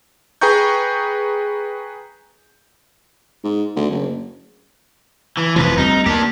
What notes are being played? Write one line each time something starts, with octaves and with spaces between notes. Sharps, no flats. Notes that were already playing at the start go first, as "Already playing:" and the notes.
G#4 B4 G5 A#5 C#6 G6
G#2
D2
F#1
E3
F1 C3 E3 F3 B4
D2 G3 C4 D#4
D2 A#3 D4 G4